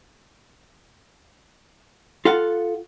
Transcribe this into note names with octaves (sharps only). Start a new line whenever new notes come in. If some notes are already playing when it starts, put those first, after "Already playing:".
F4 A4 F5 F#5